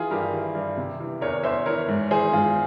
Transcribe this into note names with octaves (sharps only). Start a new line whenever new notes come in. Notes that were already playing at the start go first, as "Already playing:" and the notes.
Already playing: E3 F4 G#4
G2 G4 A#4
E3
G2
C3
E3
E2 A#4 C#5
E2 C5 E5
E3 A#4 C#5
G#2
E3 G#4 C5
G#2 F4 G#4